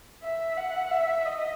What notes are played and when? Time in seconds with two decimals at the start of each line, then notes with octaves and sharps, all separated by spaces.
0.23 E5
0.58 F#5
0.91 E5
1.26 D#5